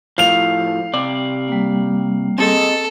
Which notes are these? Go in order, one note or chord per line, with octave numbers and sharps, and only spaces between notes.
A2 F3 F5 F7
C3 D5
G3 A#3
C4 G#4 A4 D#5